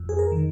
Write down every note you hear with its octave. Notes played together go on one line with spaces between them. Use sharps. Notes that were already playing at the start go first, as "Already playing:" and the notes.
Already playing: F2
G#4
A#4
D#3